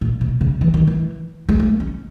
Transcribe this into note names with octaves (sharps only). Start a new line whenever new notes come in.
A#2
B2
C#3
E3
D#3
E3
G#3
A#3
C#4